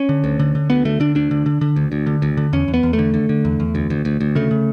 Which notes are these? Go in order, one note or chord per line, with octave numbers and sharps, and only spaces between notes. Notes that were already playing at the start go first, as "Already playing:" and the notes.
Already playing: C#4
D3
D2
D3
D3
D2 B3
D3 A3
D3 D4
D2 D4
D3
D3
D3
D2
D2
D3
D2
D3
E2 C#4
E2
B3
E2
A3
D3
D3
D3
E2
E2
D2
D2
D2
D2
C#3 A3
C#3